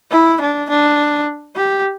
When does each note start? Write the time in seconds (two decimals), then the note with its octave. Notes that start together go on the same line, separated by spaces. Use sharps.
0.11 E4
0.41 D4
0.70 D4
1.56 G4